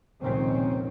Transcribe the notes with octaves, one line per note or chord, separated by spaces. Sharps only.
F1 C#2 A#2 D#3 C4 C#4